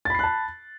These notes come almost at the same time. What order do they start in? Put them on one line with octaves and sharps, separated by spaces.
A6 B5 C7 F#6 A5